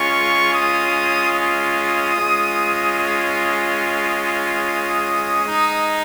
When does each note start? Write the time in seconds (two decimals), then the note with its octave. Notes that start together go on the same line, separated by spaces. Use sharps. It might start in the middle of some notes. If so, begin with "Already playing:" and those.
Already playing: G#3 C#4 F4 C#6
0.53 D#6
1.35 D#6
2.16 G#3 C#4 F4
2.99 D#6
5.45 G#3 D#4